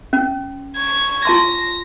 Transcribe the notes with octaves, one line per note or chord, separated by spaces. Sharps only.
C#4
C#6 G#6
F4 A5 C6 A#6